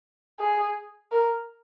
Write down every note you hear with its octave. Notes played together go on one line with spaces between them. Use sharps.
G#4
A#4